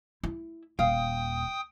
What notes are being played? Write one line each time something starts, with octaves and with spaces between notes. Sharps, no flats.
E4
D#1 F5 G5 D#6